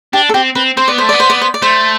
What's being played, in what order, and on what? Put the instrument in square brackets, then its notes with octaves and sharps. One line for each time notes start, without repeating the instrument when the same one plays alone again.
[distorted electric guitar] D4 [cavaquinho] G4
[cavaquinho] A4
[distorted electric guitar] C4 [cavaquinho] G4
[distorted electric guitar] C4 [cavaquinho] B4
[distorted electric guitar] C4 [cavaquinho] C5
[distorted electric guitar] B3 [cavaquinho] D5
[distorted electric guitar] A3 [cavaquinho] C5
[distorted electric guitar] B3 [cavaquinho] D5
[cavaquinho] C5
D5
C5
D5
[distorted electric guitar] A3 [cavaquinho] C5